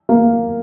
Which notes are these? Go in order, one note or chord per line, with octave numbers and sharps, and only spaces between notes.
A#3